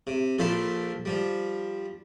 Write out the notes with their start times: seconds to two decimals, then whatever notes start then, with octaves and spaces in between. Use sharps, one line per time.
0.07 C3
0.39 A#1 A#2 F3 A4 C5 B5
1.05 F3 G3